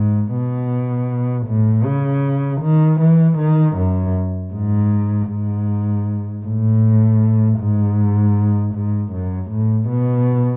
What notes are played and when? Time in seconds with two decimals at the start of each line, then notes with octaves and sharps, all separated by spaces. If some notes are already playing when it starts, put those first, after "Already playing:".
Already playing: G#2
0.32 B2
1.47 A2
1.84 C#3
2.62 D#3
3.00 E3
3.38 D#3
3.76 F#2
4.53 G#2
5.29 G#2
6.45 A2
7.59 G#2
8.74 G#2
9.12 F#2
9.51 A2
9.89 B2